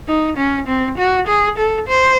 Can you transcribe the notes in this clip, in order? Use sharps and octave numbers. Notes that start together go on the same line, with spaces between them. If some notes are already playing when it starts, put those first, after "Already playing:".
D#4
C#4
C4
F#4
G#4
A4
C5